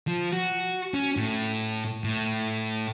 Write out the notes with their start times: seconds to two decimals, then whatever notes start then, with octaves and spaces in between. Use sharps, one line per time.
0.07 F3
0.33 F#4
0.94 C#4
1.17 A2
2.04 A2